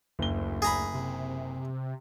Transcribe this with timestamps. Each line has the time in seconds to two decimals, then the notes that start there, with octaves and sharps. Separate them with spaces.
0.19 F#1 D2 G7
0.62 G#4 A#5 B5
0.94 C3